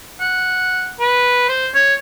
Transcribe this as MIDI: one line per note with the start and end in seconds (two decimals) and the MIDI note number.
0.21 0.91 78
1.00 1.46 71
1.49 1.68 72
1.75 1.95 73